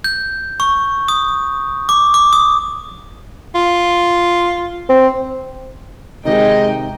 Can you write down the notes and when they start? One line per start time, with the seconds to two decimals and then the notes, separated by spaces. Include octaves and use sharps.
0.04 G6
0.60 C#6
1.08 D#6
1.89 D6
2.14 D6
2.33 D#6
3.55 F4
4.89 C4
6.25 C3 D#3 G#3 D#4 G4 D#5 G5